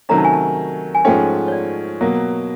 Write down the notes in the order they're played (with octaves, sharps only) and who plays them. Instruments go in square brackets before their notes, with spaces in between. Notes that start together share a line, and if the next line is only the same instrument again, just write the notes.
[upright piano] C3 D#3 F#3 A3 C#4 [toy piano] A#5
[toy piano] A5
G#5
A5
G#5
[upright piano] G#2 F3 A3 C#4 [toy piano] G5
[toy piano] C#5
D5
[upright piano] B2 F#3 A#3